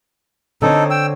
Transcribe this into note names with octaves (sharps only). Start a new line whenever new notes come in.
D3 C4 D#4 A4 C#5
G5 E6